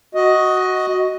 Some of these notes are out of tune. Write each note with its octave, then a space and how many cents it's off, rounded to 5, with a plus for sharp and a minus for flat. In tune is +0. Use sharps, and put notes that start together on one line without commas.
F#4 +0 D#5 +10